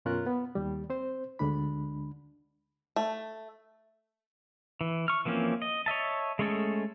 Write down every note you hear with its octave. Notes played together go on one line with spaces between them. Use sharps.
F#2 B2 C#4 F4 A#4 F#6
B3
D#2 G3
C4 C5
D2 D3 G#3 D4 B5
A3
E3
C#6 F6
E3 F3 A#3 C4 C#4
D#5
C#5 D#5 E5 A5
G#3 A3 C#4 G#4 A4